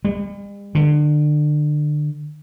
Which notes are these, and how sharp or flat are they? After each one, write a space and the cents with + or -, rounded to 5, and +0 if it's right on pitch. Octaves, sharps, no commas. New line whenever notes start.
G3 +45
D3 +30